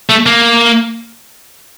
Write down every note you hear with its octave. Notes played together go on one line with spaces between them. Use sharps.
A3
A#3